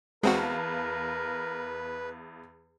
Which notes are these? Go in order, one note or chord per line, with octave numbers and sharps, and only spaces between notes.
E2 G#3 C4 F#4 A#4 B4 F5 A5